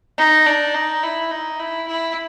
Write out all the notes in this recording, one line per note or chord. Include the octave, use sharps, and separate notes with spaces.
D#4
D4
D#4
E4
D#4
E4
E4